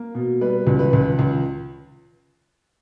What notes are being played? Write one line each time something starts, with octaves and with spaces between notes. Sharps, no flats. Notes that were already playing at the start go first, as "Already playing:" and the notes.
Already playing: A#3
B2
G3 B4
C#2
B4
C#2
C#2